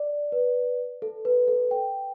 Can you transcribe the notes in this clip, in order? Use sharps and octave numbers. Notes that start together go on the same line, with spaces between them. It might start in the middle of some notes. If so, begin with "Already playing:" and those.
Already playing: D5
B4
A4
B4
A4
G5